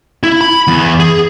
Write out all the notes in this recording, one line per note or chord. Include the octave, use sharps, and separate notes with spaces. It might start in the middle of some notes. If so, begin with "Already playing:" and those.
E4
B5
E2
G#4